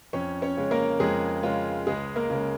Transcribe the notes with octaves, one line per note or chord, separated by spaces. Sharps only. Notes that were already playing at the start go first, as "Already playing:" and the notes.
F2 C#4 C#5
C#4 C#5
C#3 G#3
A#3 A#4
F2 G#3 G#4
C#3 G#3 F4
C#2 G#3 G#4
A#3 A#4
C#3 G#3